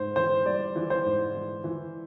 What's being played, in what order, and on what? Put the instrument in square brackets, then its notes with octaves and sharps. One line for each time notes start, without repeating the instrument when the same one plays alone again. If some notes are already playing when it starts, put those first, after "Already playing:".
Already playing: [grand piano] G#2 [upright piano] C5
[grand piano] E3 [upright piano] C5
[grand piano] G3 [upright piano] D5
[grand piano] E3
[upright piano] C5
[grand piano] G#2
E3
E3